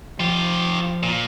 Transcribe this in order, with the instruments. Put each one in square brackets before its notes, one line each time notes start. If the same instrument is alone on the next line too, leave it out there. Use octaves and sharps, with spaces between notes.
[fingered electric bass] F3 [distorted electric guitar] F4 G4
[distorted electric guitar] A#2